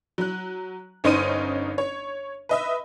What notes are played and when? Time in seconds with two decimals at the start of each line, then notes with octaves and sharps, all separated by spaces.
0.18 F#3 F#6
1.04 G1 C#4 D#4 C5 D#6 D#7
1.78 C#5
2.49 B4 D#5 E5